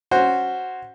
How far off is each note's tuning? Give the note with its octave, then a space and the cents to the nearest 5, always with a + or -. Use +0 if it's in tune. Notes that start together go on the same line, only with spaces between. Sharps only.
C#4 +0 F#4 +0 C5 +0